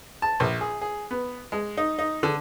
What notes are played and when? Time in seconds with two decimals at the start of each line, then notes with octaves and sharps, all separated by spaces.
0.22 A5
0.40 A#1
0.61 G#4
0.81 G#4
1.11 B3
1.52 G#3
1.77 D#4
1.99 D#4
2.23 D3